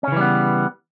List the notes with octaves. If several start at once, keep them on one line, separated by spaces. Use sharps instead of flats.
C#3 E3 G3 B3 C#4